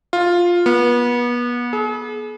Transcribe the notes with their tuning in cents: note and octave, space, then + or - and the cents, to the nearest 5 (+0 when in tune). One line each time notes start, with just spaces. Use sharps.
F4 +5
B3 -30
G#4 +40